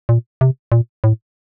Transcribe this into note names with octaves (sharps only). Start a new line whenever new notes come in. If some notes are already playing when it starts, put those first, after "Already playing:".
A#2
C3
A#2
A2